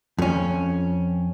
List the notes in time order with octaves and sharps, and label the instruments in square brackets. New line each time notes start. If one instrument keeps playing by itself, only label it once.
[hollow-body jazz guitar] F2 C#4